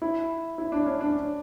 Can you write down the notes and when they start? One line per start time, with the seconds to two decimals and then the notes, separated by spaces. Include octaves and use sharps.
0.02 E4
0.58 E4
0.72 D4
0.86 C#4
1.01 D4